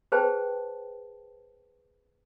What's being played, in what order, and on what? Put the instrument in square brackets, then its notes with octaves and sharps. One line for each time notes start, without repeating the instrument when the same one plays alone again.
[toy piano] G#4 B4 C5 G5 A5